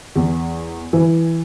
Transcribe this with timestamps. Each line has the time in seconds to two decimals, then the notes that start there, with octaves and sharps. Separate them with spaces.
0.16 E2
0.93 E3